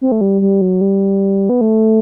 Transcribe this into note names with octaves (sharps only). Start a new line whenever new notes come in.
C4
A3
G3
G3
F#3
G3
B3
A3